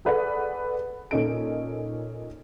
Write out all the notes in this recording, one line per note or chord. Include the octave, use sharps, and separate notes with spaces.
G#4 A4 B4 D5 F#5
A#2 C#4 D#4 A4 D7